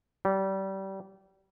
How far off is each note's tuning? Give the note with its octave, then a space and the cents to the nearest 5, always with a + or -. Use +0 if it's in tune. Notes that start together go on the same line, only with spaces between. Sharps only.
G3 -25